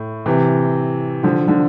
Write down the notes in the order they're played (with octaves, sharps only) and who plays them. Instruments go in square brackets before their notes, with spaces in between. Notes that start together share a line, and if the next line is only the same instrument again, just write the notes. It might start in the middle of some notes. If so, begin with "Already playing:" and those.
Already playing: [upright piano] A2
C3 E3
D3 F3
D3 F3